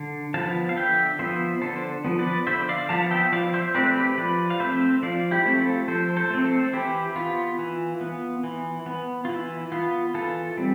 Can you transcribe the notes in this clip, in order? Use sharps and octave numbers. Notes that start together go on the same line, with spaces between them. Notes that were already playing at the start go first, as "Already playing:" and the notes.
Already playing: D3
F3 B3 F5 A5
F5
D3 E5 G5
F3 B3 C5 E5
D3 A4 C5
F3 B3
B4 D5
D3 C5 E5
D5 F5
F3 B3 F5 A5
E5 G5
F3 D5 F5
C5 E5
A3 C4 B4 D5
G4 B4
F3 B4 D5
F5
A3 C4 C5 E5
F3 D5 F5
E4 G4
A3 C4
F4 A4
F3 A4 C5
A4 C5
A3 C4
A4 C5
E3 E4 G4
B3 F4
E3
B3
E3
B3
F4
E3 E4
B3 F4
E3 F4 A4
G3 C4